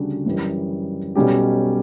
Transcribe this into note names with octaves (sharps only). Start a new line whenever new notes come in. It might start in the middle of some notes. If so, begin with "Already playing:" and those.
Already playing: D2 C#3 G3 D4 F#4
F#2 E3 G3
B1 B2 G3 C#4 G4